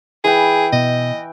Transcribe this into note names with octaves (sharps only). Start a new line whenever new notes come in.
E3 G#4 G5
B2 D#5